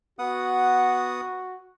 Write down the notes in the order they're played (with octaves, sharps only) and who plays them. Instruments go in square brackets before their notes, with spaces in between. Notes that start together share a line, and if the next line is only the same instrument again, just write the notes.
[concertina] B3 F#5 D#6 [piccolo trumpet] F#4